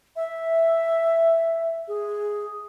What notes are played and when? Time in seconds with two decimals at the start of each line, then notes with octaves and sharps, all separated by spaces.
0.16 E5
1.88 G#4